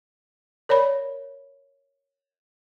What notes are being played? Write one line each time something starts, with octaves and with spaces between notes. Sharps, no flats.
A#4 C#5 D5 B5